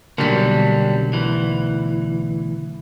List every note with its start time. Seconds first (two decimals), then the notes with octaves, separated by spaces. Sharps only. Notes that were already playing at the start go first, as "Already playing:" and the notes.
0.18 B1 D3 F#3 G3 A#3
1.13 D2 E3